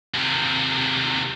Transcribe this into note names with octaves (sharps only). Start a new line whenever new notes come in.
D#2 C3